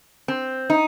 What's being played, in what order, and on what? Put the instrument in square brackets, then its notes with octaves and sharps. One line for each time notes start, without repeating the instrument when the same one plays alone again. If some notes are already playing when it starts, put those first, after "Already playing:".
[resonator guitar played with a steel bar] C4
D#4